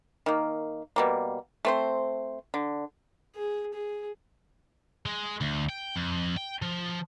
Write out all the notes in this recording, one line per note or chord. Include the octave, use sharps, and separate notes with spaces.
D#3 A#3
B2 G3 A#3
A3 C4 C5
D3
G#4
G#4
G#3
D2
G5
F2
G5
F3